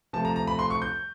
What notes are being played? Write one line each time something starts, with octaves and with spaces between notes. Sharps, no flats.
C3 F3 A3 A5
A#5
A#5
B5
C6
C#6
G6